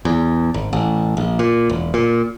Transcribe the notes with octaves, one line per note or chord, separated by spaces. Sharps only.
E2
G#1
A1
A#1
A#2
E1
A#2